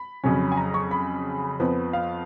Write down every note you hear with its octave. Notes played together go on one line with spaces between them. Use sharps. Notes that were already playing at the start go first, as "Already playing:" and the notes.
Already playing: B5
F2 C#3 F#3 C#4
G#5
A#5
C#6
B5
F2 F3 B3
F5